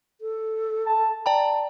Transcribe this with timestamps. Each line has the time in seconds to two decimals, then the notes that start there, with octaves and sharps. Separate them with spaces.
0.21 A4
0.86 A5
1.26 D5 G5 A5 A#5